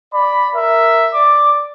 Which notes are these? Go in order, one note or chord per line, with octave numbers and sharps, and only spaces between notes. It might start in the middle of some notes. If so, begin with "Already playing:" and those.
D5 B5
A#4 E5
D5 D6